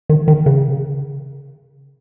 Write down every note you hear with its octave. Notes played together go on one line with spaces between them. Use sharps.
D#3
D#3
C#3